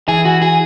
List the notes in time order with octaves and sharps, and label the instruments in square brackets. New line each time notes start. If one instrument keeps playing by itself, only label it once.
[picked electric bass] E3 [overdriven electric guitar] G#4
[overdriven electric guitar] F#4
G#4